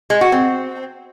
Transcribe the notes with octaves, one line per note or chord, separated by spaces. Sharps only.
G#3
F#4
C4